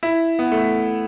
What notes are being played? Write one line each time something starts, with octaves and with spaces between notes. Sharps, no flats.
E4
B3
A3